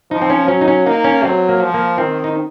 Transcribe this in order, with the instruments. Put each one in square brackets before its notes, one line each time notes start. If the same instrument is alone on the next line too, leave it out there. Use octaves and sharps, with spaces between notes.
[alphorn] F3 [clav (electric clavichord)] D#4
[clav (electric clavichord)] C4
C#4
[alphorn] F#3 [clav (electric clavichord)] C#4
[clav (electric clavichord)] D#4
C#4
[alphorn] A#3 [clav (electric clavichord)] D#4
[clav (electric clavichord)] C#4
[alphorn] F#3 [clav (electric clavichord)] C4
[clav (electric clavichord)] A#3
[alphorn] F3
[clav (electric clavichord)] A#3
[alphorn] D#3 [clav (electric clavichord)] C4
[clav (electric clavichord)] D#4